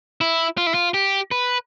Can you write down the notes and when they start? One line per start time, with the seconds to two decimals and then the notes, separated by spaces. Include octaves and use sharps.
0.21 E4
0.58 F4
0.67 E4
0.74 F4
0.94 G4
1.31 B4